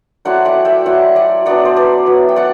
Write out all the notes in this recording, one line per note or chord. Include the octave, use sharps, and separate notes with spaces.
F#3 A3 C4 E4 D5 F#5
D5 F#5
E5 G5
F#3 C4 E4 D5 F#5
D5 F#5
F#3 B3 D4 D5 F#5
C5
B4 D5
F#3 B3 E4
G5
D5 F#5